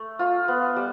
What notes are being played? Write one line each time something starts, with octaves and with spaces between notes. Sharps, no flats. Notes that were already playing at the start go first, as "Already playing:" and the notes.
Already playing: A3
F4
B3
G3